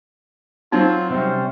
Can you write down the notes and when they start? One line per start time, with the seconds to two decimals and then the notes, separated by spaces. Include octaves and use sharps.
0.72 F#3 C4 D#4 F4
1.10 C3 G3 C#4 C5